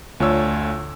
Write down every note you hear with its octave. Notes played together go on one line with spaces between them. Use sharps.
D2 D4 F4 C#5 E6